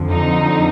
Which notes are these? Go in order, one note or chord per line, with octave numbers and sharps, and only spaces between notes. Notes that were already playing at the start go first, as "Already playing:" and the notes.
Already playing: F2 D3 F3
D#4